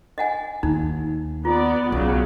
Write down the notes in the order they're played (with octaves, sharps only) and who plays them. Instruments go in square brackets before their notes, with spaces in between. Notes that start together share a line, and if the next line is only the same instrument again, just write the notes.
[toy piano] D#5 F#5 G#5
[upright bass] D#2 [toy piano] D#4
[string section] B3 D5 [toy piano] F4
[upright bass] B1 [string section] C#3 F#3